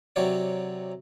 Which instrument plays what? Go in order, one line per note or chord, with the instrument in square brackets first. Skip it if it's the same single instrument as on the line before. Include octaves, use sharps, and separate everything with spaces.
[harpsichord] C3 F#3 C#5 D5